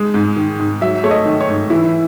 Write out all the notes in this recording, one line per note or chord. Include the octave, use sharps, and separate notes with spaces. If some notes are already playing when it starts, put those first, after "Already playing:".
Already playing: G#3
G#2
D#3
G#2
F#3 E5
A3 C#5
D#5
D#3
C#5
G#2
E3 E4